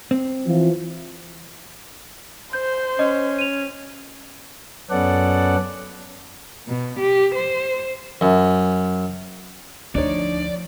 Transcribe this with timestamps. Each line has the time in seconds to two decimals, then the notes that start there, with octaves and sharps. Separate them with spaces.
0.11 C4
0.47 E3 F3
2.53 C5 G6
2.99 C#4 D#5
3.38 D#7 F7
4.90 F#2 B3 C#4 A4 D5 F#5
6.68 B2
7.00 G4
7.35 C5
8.21 F#2
9.95 D2 F3 D4 D#4 C#5 D5